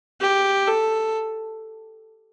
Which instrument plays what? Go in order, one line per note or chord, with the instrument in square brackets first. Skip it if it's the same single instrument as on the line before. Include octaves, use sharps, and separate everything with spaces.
[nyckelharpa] G4
A4